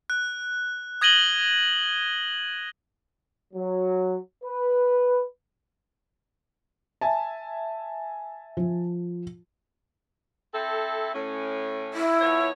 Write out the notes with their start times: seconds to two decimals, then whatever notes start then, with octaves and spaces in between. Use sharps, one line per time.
0.10 F#6
1.01 D#6 G#6 A#6 D#7 F#7 G7
3.54 F#3
4.44 B4
7.01 E5 G#5 A5
8.57 F3
10.54 C4 E4 A4
11.14 A2 C#4
11.93 E4
12.20 F3 B3 C#5